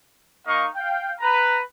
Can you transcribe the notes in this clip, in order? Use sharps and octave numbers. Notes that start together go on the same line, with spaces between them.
A#3 D#4 D#5 F5 C#6
F5 G5
B4 A#5